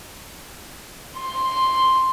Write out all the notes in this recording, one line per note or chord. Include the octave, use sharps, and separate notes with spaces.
C6